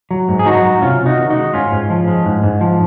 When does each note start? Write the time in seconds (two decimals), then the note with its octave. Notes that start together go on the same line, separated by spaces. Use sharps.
0.11 F#3
0.29 G#2
0.39 G#4
0.45 F#3 D#4 F#4
0.63 G#2
0.81 C3 C#4 F4
1.00 C3
1.06 D#4 F#4
1.18 D#3
1.30 D#4 F#4
1.36 G#3
1.54 G#2 C#4 F4
1.72 G#2
1.90 F3
2.08 G#3
2.26 G#2
2.44 G#2
2.61 F3